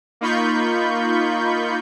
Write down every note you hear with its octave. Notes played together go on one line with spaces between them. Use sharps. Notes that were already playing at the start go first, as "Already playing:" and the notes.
A#3 D#4 F4 B5 C#6 G6